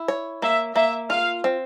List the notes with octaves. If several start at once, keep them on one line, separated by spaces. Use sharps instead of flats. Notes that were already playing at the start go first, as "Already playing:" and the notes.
Already playing: E4
C#5
A#3 E5
A#3 E5
F4 F5
C4